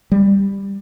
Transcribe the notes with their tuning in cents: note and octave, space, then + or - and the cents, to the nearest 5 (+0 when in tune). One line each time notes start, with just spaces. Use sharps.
G3 +10